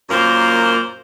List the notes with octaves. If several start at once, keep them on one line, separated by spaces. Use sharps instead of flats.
F#2 A#2 A#3 C5